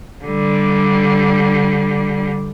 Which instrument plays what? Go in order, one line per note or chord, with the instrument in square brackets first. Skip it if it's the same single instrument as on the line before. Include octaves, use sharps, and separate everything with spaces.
[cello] D3 G3